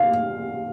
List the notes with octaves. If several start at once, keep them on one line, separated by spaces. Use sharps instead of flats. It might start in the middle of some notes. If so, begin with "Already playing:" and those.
Already playing: F5